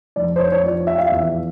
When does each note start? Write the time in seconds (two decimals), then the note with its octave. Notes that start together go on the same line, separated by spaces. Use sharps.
0.16 F1 D5
0.36 C5
0.39 C#5
0.52 C#5
0.64 F3 D5
0.87 E5
0.98 F5
1.09 E2 E5